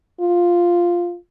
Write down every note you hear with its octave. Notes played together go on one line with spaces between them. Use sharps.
F4